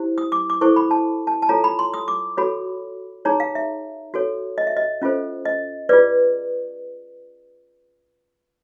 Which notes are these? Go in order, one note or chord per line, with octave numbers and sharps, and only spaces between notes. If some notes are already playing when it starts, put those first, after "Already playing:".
Already playing: E4 G4 C5
D#6
D6
D6
E4 A4 C5 C#6
B5
A5
A5
A5
F4 A4 C#5 A#5
B5
C6
D#6
D6
F#4 A4 C#5 B5
D#4 G#4 C#5 A#5
F5
E5
F#4 A4 C#5
D#5
E5
D#5
C#4 F4 A4 C5
D#5
F4 G#4 B4 D5